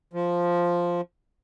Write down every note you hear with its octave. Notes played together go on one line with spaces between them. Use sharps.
F3